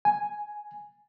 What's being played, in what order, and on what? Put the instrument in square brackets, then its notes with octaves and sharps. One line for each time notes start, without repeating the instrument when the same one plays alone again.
[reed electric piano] G#5